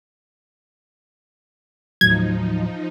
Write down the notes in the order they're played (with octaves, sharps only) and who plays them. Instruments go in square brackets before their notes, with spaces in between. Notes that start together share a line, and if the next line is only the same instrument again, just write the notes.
[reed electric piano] D#2 A2 F#3 [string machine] F3 D#4 [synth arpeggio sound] G#6